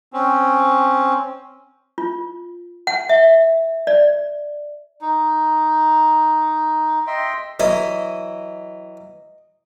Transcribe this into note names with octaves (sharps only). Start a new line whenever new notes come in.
C4 C#4
F4
F#5
E5
D5
D#4
D#5 E5 G5 C6
E3 F#3 E4 D#5